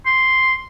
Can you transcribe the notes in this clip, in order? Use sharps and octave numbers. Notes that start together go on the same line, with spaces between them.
C6